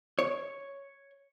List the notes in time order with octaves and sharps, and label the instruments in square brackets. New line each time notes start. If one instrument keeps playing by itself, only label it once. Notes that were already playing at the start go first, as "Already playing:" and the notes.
[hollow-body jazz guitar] C#5